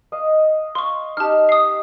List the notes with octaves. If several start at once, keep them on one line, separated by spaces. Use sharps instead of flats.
D#5 F5
F5 C6 C#6
D#4 G4 A5 F6
D#6 C7